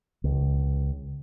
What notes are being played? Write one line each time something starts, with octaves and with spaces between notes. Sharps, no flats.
C#2